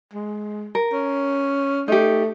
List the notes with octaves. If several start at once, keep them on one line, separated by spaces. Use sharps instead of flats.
G#3
A#4
C#4
A3 D#4 G4